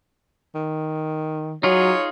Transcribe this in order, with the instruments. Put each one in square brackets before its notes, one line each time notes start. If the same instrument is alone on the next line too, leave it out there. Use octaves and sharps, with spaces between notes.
[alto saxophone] D#3
[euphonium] F#3 [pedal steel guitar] D#4 F4 G#4 [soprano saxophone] C#5